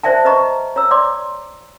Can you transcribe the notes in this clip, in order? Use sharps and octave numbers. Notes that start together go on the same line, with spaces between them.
C5 D5 E5 G5 A5
B4 D#5 A#5 C#6
C#5 A#5 E6
C#5 D5 C6 D6